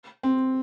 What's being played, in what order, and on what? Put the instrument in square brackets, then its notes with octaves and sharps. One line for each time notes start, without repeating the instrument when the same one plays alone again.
[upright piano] C4